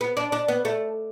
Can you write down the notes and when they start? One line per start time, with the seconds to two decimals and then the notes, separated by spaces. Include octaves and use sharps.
0.01 B3
0.17 D4
0.32 D4
0.48 B3
0.65 A3